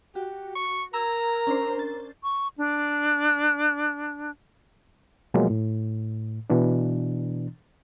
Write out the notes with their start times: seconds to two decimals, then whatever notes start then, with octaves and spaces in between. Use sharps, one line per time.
0.15 F#4 G4
0.56 C#6
0.94 A#4 A#5 E6 G#6
1.47 C#4 D4 C5
1.79 A6
2.23 C#6
2.58 D4
5.34 B2 F3 F#3 G#3 A#3
5.50 A2
6.50 B2 E3 D4